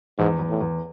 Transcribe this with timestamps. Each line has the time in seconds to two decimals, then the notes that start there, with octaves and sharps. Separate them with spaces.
0.18 E2 G#2
0.39 E2
0.50 A2
0.61 E2